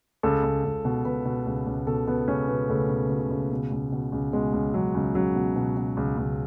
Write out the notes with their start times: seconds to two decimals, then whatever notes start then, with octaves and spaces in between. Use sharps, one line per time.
0.23 C#2 A4
0.44 C#2
0.64 C#2
0.85 B2
1.05 B2 B4
1.25 B2
1.46 C#2
1.67 C#2
1.87 B2 A4
2.08 B2 B3
2.28 C#2 C#4
2.48 B2 B3
2.69 C#2 A3
2.89 B2
3.10 B2
3.31 C#2
3.51 B2
3.72 C#2
3.92 B2
4.12 C#2
4.33 B2 G#3
4.53 C#2
4.74 C#2 F#3
4.95 C#2
5.14 C#2 F#3
5.36 B2
5.56 B2
5.77 B2
5.97 C#2
6.17 C#2